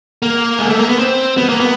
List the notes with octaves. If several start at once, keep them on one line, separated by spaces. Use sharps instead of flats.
A#3
G#3
A3
A#3
B3
C4
B3
A#3
B3